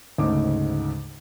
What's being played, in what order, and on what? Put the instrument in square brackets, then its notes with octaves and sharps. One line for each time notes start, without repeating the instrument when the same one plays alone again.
[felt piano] D2 G#2 C#3 D6